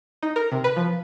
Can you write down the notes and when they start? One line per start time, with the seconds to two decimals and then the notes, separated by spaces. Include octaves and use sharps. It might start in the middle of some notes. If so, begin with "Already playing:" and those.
0.23 D#4
0.36 A#4
0.52 C3
0.64 B4
0.77 F3